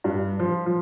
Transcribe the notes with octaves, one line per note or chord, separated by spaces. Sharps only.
G2
F3
F3